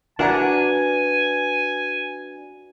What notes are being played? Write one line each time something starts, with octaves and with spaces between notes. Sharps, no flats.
D4 F#4 A#4 B4 F#5 G#5 A#5